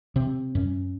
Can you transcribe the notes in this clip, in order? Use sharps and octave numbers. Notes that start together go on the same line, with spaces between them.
C3 C4
F#2 C#4